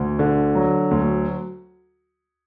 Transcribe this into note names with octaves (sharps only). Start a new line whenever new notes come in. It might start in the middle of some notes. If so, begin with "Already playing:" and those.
Already playing: D2
D3
F#3
D2